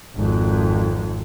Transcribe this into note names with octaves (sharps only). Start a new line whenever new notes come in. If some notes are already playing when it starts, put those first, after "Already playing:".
G#1 F2